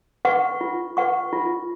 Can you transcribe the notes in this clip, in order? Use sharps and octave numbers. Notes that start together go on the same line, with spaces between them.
B4 F#5 C#6
F4
B4 F#5 C#6
F4